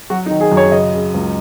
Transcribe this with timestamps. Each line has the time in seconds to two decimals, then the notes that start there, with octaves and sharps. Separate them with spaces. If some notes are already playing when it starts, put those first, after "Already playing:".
0.10 F#3 F#4
0.26 D#4
0.31 D#3
0.41 G#4
0.52 F#2
0.57 C#5
0.72 C#3 D#5
0.94 C#3
1.14 C#2